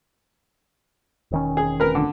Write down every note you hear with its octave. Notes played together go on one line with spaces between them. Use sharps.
E1 D#3 C#4
G#4
A#4 B4
D3